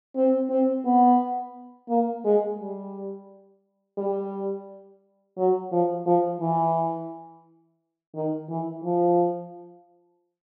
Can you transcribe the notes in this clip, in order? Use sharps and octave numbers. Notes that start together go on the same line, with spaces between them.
C4
C4
B3
A#3
G#3
G3
G3
F#3
F3
F3
E3
D#3
E3
F3